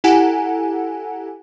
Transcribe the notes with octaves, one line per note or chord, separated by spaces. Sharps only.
E4 G4 A4 F#5 G#5 A#5